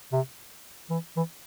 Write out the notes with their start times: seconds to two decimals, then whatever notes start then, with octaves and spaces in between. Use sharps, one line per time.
0.12 C3
0.90 E3
1.16 E3